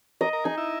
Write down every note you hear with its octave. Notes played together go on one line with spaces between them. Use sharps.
A#4 D#5
A#4
D#4 G#4
E4